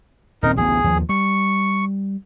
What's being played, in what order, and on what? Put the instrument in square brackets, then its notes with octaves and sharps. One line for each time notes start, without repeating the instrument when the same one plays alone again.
[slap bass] D#1 C4 [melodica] D#4 A#4
[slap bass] A1 D2 B3 [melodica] G#4
[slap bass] D#2 F3
[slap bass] G3 [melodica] C#6